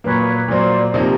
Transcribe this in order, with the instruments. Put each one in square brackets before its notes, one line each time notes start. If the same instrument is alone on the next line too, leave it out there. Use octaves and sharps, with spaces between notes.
[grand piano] A#2 F#3 A#3 [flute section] B4 C#5
[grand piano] A#2 F#3 A#3 [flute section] C5 D5
[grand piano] C3 F3 A#3 D#4 [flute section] C#5 D#5